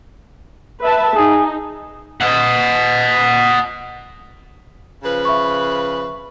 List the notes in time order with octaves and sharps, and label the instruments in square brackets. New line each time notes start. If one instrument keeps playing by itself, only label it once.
[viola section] B4 E5 A5
[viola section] D#4 [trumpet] G#4
[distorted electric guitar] D#5 F#5
[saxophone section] C#3 F3 B4
[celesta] E5 B5 C#6